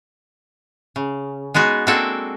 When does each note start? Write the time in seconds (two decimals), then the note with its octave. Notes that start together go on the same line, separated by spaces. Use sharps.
0.96 C#3
1.54 G#3 B3 D#4 F#4
1.87 G#3 A#3 C4 D4 F#4 A4